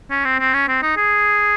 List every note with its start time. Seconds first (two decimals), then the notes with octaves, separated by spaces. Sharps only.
0.10 C#4
0.25 C4
0.39 C4
0.53 C#4
0.68 C4
0.82 D#4
0.97 G#4